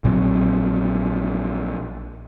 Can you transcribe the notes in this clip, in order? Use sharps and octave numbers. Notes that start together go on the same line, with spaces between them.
A#1 A#2 F#3 C4